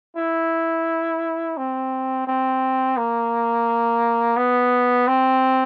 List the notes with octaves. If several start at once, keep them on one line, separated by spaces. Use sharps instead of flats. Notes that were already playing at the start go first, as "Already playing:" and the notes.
E4
C4
C4
A#3
B3
C4